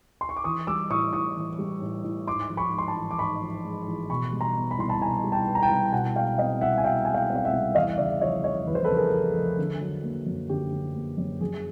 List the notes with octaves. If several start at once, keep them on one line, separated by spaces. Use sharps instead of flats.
C6
C#6
D6
E3 C#6 D#6
G3 D6 E6
A2 C#6 D#6
A2 C#6 D#6
E3
G3
A2
A2
G#2 C6 D6
F3
B5 C#6
G#3
C6
A5 B5
A1
D6
G#2 B5 C#6
F3
G#3
A1
B2 B5 C#6
G3
A#5 C6
B3
B5
C2 C6
A5 B5
B2 G#5 A#5
G3
G5 A5
B3
A#5
G5 A5
C2
B2 F#5 G#5
G#3 F5 G5
C4 D#5 F5
C2 E5 F#5
G#5
B2 F5 G5
G#3 G#5
F5 G5
C4
F5
E5 F#5
C2
E2 D#5 F5
C#3 D5 E5
F3 C#5 D#5
F1 C#5 D#5
E2 B4
C5
A4 B4
C#3
G#4 A#4
F3
F1
D3
F#3
A#3
F#2
D3 G4
F#3
A#3
F#2
F#2 G#4